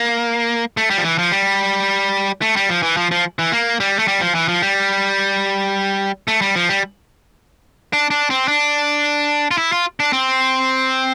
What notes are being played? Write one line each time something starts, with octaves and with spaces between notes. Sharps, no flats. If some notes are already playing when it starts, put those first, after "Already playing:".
Already playing: A#3
A3
G3
F3
E3
F3
G3
A3
G3
F3
E3
F3
F3
E3
A#3
G3
A3
G3
F3
E3
F3
G3
A3
G3
F3
G3
D4
D4
C4
D4
F4
E4
F4
D4
C4